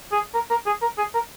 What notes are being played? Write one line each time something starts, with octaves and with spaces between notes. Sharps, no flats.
G#4
A#4
A#4
G#4
A#4
G#4
A#4